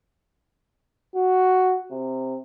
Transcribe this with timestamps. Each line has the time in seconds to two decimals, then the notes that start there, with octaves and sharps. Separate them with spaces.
1.15 F#4
1.91 C3